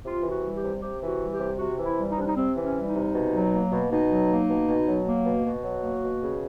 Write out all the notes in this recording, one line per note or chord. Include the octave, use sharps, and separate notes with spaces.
C3 F4
E3
F#4
G3
G4
C3
C3 G4
E3
F#4
G3
G4
C3
C3 F#4
E3
E4
G3
D#4
C3 D4
D#4
C3 C4
E3
C#4
G3
D#4
C3
B2
F#3
A#3
B2
B2 D#4
F#3
A#3
B2
B2
F#3
A#3
B2
B2 F#4
F#3
A#3
B2
C#3